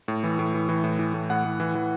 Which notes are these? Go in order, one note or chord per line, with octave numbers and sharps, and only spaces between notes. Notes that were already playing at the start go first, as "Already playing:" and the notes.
A2
E3
A2
E3
E3
A2
E3
A2
A2 F#5
A2
E3
E3